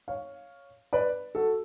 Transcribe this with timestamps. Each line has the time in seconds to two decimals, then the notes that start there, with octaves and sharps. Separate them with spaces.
0.08 C#5 F5
0.93 B4 D5
1.35 F#4 A4